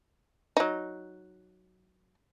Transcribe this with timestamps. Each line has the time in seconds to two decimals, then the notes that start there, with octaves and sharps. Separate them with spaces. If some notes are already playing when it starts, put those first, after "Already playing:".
0.57 F#3 D#4